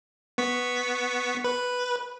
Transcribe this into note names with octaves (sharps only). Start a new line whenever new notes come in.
B3 C#6 B6
B4